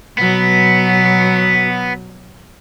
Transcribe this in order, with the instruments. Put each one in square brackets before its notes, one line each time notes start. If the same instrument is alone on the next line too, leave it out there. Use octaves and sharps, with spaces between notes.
[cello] B2 F#3 [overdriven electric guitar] B3